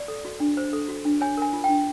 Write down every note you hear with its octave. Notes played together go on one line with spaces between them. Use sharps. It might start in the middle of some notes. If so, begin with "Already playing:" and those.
Already playing: D5
A4
F#4
D4
C5
A4
F#4
D4
C#5 G#5
A#4 G#5
F4
D4 G5